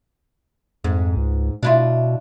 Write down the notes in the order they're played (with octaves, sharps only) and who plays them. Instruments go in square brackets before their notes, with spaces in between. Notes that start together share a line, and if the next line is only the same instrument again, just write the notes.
[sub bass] F2 [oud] G#2
[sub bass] C#2
[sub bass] B2 [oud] D4 E4 F4